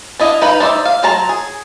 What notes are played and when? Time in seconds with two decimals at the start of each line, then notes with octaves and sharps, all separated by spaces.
0.20 D4 E4 D#5 F5
0.41 D#4 B4 F5 B5
0.60 D4 D#4 C5 D5 E5
0.85 F5
1.03 F#3 F#4 C5 A5 A#5
1.29 G#4